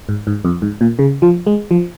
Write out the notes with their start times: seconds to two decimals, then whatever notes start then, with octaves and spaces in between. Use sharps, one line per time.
0.09 G#2
0.27 G#2
0.45 F2
0.62 G#2
0.81 A#2
0.99 C#3
1.22 F3
1.47 G#3
1.71 F3